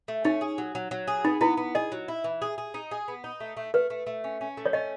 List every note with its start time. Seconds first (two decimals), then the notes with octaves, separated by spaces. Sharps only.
0.08 A3
0.25 C#4 D#4
0.41 G#4
0.58 F#3
0.75 F#3
0.91 F#3
1.08 G#4
1.24 B3 D#4
1.41 B3 E4
1.57 B3
1.75 G#4 D#5
1.92 F#3
2.08 E4
2.24 E3
2.42 G#4
2.58 G#4
2.74 D#4
2.91 G#4
3.08 B3
3.24 D#4
3.40 A3
3.57 A3
3.74 A3 B4
3.90 A3
4.07 A3
4.24 C#4
4.41 C#4
4.57 A3
4.66 C#5
4.73 C#4 D#5